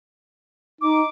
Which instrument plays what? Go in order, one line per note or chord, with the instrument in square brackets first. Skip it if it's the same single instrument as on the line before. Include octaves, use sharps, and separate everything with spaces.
[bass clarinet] D#4 [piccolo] D6